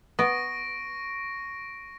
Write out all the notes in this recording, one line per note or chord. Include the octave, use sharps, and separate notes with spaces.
B3 C#6 A#6 D7